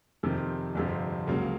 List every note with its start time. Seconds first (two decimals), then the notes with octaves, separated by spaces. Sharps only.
0.23 F2 C3 D#3
0.75 G1 F2 C3
1.27 C#2 C#3 F#3 A#3